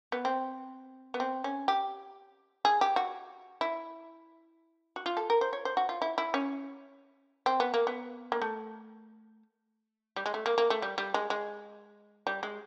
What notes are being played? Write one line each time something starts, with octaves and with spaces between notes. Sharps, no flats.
B3
C4
B3
C4
C#4
G4
G#4
G4
F#4
E4
F#4
F4
A4
A#4
C5
C#5
C5
F#4
F4
E4
E4
C#4
C4
B3
A#3
B3
A#3
A3
G3
G#3
A3
A#3
A#3
A3
G3
G3
G#3
G#3
G3
G#3